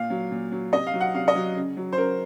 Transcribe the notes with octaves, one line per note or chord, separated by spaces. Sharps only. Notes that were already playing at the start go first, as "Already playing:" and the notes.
Already playing: A#2 F5
F#3
A#2
F#3
C3 D#5
F5
F#3
F#5
C3 F5
D#5
F#3
C#3
F#3
C5
C#3 A#4